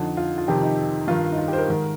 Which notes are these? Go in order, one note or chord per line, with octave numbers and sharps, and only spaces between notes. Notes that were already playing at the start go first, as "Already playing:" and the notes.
Already playing: F2 D3 D#4
F4
F4
F2 C3 D#3 G4
D#4
G2 D#3 F4
D#4
F4
G4
C5
A#4
G#2 D#3